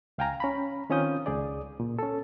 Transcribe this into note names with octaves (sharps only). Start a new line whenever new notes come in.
C#2 F5 G5 G#5 A#5
C#4 A#5 B5
D#3 C4 C#4 F4 D#6 G6
C#2 G#4 D5
A#2
C#4 A4